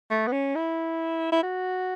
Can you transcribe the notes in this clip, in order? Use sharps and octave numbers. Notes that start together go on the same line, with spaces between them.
A3
B3
C#4
E4
E4
F#4